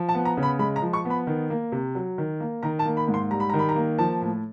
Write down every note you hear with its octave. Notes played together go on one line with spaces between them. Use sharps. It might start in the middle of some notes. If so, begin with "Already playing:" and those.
Already playing: F3
A5
B3
A#5
C#3
B5
G#3 B5
A#5
F3
C#6
B3
B5
D#3
A#3
C3
F#3
D#3
A#3
D#3 A#5
A5
A#3
B5
G#2
C6
G3 A#5
B5
D#3 A#5
B5
A#5
A#3
F3 A5
A2